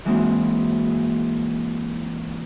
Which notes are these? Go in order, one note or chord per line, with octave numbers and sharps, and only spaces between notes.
E3 G#3 A#3 C4 D#4 F#4